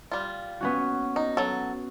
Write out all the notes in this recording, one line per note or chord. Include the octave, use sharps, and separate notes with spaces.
G3 F4
B3 C#4 F#4
D#4
F#3 A4